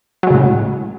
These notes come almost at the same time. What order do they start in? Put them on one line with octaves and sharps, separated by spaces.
F#3 G#3 C#3 A2